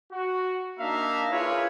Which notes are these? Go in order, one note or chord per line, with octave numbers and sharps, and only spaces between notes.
F#4
A#3 D4 D#4 E5 F5 A#5
E4 F4 G#4 A#4 B4 C#5